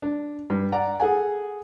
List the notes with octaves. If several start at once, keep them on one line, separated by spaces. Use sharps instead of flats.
D4
G2
D5 F#5 A#5
G#4 A4 F#5 G#5